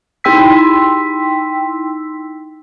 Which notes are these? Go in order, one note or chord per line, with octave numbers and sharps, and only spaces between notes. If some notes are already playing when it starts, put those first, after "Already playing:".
D#4 E4 G5 C6 E6 B6